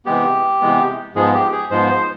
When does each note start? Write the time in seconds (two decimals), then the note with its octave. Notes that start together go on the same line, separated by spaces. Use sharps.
0.06 C3 E3 G#3 B3 G4
0.61 C3 E3 G#3 B3
1.15 G#2 F3 G#3 B3 G#4
1.34 G4
1.52 G#4
1.71 G#2 F3 G#3 B3 C5
1.89 C5